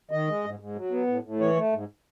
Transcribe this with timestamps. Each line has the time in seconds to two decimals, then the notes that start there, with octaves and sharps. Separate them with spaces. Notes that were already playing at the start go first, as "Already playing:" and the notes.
0.11 D#3 D#5
0.28 G#3
0.44 G#2
0.59 G#2
0.76 F#3
0.91 B3
1.07 A2
1.24 A2
1.40 E3 C#5
1.56 A3
1.73 G#2